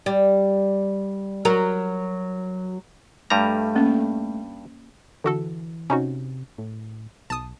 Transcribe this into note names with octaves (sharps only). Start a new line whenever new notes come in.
G3
F#3 A#4
G2 G3 A3 A#5
A#3 C#4
D3 E3 F#4 A4
C3 C#4 D#4 F#4
A2
B1 A5 D#6